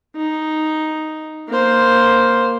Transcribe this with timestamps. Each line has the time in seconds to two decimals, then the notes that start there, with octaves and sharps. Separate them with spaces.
0.16 D#4
1.48 A#3 C5